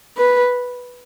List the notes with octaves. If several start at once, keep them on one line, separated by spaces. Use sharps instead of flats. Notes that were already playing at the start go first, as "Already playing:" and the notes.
B4